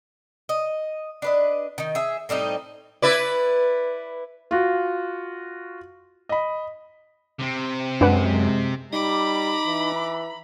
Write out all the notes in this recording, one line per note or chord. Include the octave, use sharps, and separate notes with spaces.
D#5
D4 B4 D#5
D#3 D#4
G#4 E5
A2 G3 C4 D#4
E4 B4 D5
F4 F#4
D#5 B5
C3 C4
F#2 G#3 D4 B4 F#5
G3 D#4 D#5 A#5 B5 D6
E3